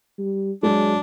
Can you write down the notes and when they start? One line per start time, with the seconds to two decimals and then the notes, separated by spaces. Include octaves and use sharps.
0.18 G3
0.63 F#3 G#3 D4